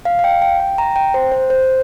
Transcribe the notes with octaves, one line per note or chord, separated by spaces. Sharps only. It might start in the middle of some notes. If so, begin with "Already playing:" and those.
F5
F5
G5
G5
G5
A#5
G5
C5
C5
C5